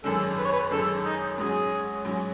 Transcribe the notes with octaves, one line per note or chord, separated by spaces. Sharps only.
G#1 F#2 D#3 G#3 C#4 A4
B4
C#5
B4
G#1 F#2 D#3 G#3 C#4 A4
D#4
G#2 F#3 C#4 G#4
G#2 F#3 C#4